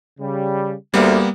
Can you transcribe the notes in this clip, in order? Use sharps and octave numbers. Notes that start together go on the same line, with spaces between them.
C#3 G3
D2 G3 A#3 B3